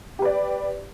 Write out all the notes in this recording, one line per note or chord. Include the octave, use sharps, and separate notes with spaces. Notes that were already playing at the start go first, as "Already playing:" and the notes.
G4 B4 D5